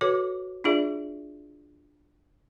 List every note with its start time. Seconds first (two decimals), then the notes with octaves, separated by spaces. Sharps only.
0.01 F#4 A4 B4 C#5 D6
0.64 D4 E4 F4 G#4 D5 E5